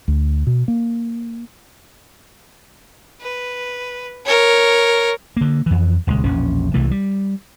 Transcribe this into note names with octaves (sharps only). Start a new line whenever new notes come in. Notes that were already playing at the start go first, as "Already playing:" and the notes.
D2
B2
A#3
B4
A#4 C#5
D3 A#3
F2 E3
D#1 C#2 G#3
E1 A#1 C#4
C2 C3 E3 A3
G3